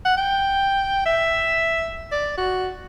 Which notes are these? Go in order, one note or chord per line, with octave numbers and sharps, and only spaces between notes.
F#5
G5
E5
D5
F#4